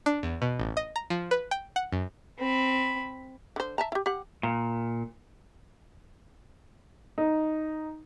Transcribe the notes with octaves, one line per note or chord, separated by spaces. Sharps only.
D4
E2
B2
A1
D#5
A#5
F3
B4
G5
F#5
F#2
C4 B5
D3 C5
E5 A5 A#5
E4 G4
G4 F#5
A#2
D#4